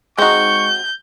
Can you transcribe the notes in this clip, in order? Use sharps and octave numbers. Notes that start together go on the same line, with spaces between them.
G#3 C4 D#4 F#4 C#6 G6